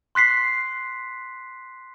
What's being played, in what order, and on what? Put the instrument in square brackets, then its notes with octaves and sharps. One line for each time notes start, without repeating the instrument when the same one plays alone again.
[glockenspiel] C6 F#6 B6 C7